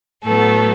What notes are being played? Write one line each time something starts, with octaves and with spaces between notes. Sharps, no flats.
A2 F#3 A3 B3 A4